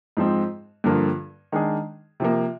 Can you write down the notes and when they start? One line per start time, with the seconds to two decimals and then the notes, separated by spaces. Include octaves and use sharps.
0.17 G#2 F3 C4
0.84 G2 D3 F3 A#3
1.52 D#3 G#3 D4 G#4
2.20 C3 F3 A#3